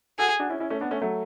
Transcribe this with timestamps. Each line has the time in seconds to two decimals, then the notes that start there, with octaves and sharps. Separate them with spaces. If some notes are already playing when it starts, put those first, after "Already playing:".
0.18 F#4 G#4 A4
0.40 D4 F#4
0.50 C#4 E4
0.60 C#4 E4
0.70 A3 C#4
0.81 B3 D4
0.91 A3 C#4
1.01 F#3 A3